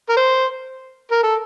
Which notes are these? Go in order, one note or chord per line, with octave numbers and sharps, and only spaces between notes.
A#4
C5
A#4
A4